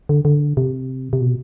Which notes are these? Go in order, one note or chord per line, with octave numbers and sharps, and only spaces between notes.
D3
D3
C3
C3
B2